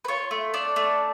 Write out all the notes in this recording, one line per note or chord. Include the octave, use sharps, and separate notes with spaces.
B4
F4 C#5
A3
D4 D5
A3